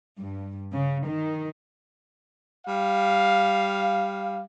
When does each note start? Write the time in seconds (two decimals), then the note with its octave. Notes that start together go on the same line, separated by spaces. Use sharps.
0.17 G2
0.73 C#3
1.06 D#3
2.66 G3 F5